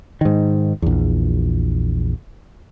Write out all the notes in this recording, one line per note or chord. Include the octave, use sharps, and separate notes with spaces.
G#2 D#3
A#1 E2